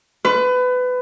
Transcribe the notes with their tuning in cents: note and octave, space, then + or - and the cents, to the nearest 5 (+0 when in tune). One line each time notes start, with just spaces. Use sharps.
B4 +25